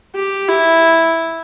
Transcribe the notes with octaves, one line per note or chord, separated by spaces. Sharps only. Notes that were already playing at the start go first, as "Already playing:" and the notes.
G4
E4